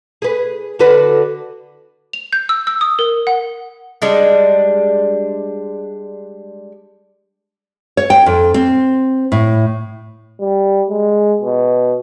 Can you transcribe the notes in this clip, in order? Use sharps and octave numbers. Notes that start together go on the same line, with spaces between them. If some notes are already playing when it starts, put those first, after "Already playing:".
G#4 B4
D3 F#4 B4
F7
G6
E6
E6
D#6
A#4
F#5
G3 G#3 D4
C#5
G5
F2
C4
A2
G3
G#3
B2